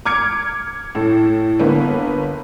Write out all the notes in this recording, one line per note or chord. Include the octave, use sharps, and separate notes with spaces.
D6 F6 G#6 C#7 D7
A2 A4
G1 A#3 B3